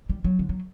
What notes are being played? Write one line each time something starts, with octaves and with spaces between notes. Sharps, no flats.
G3
F#3
D3
F#3